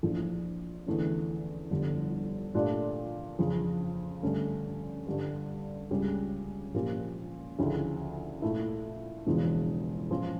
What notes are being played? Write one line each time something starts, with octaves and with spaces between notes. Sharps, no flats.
A#1 A2 F3
E2 D3 A3 C#4
G1 F2 D3 G3
A#2 A3 D4 G4
F2 C#3 F3
G2 D3 A3 C#4
G2 D3 G3
C#2 C#3 G3 C#4 G4
A#2 F3 A#3 C#4 G4
D2 C#3 F3 C#4 E4
A#2 A3 E4
E1 E2 C#3 F3
A#2 F3 C#4